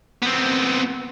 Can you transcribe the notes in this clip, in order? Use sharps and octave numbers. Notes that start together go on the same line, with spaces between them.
B3 C4